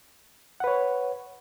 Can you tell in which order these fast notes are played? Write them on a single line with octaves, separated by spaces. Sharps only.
F#5 B4 C#5